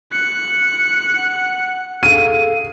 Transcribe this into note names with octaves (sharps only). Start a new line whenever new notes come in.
F#6 C#7
F#5
G#4 A4 F5 D#7